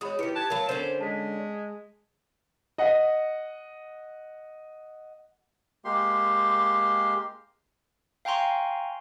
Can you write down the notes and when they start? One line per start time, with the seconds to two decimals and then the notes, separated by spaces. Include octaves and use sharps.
0.01 G#3 F#4 C#5 B5 D#6
0.19 D#3 E4 G4 B4 C#7
0.36 A5 F#6 G#6
0.50 F#3 A3 A#4 F5 B5
0.69 D3 C#4 C5
1.00 G#3 A5 B6
2.78 D#5 F#5
5.85 G#3 A#3 G4 C6
8.25 F5 G5 G#5 A#5 C6 C#6